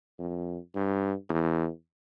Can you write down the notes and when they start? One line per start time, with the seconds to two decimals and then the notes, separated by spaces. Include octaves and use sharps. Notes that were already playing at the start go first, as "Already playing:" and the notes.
0.19 F2
0.75 G2
1.29 E2